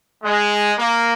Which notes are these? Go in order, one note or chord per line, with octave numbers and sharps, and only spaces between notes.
G#3
A#3